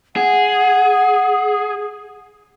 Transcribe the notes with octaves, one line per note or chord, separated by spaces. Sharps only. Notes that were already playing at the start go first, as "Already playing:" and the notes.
G#4 F#5